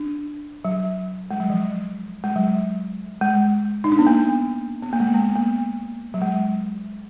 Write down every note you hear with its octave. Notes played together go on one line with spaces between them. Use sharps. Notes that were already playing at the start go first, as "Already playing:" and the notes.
Already playing: D4
F#3
G#3
F#3
F3
G#3
F#3
G#3
D#4
D4
B3
A#3
B3
A#3
G#3
A#3
B3
A#3
F#3
G#3